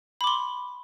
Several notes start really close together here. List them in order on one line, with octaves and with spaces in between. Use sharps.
B5 D6 C6